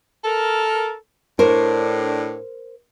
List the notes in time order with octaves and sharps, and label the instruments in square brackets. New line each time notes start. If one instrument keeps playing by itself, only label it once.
[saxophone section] A4 A#4
[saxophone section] A2 D4 [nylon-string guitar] A#4 C5